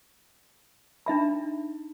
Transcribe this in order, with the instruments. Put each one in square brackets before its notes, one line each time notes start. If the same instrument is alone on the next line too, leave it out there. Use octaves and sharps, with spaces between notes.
[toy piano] D4 D#4 E5 B5